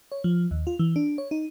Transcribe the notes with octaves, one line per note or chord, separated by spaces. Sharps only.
C#5
F3
D#2
F4
E3
D4
C#5
D#4